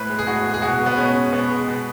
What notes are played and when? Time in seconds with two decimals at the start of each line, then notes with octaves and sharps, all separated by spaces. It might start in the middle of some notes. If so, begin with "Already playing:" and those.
Already playing: A2 B4
0.09 G#3
0.19 G#4
0.27 A2 F#4
0.45 G#3
0.54 G#4
0.62 B2 F#4
0.80 G#3
0.86 B3
0.97 B2 C#4
1.15 G#3
1.32 B2 B3
1.50 G#3
1.68 B2